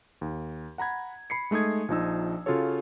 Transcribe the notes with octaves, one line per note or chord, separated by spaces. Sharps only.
D#2
F#5 A#5 B5 G#6
B5 C7 C#7
G#3 A3 D#4 D#6 G#6
A#1 F3 D#4 E6
C#3 F4 F#4 A4 C#5